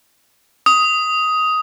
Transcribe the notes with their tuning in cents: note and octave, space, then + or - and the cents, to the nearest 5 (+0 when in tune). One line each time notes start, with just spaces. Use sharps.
D#6 +10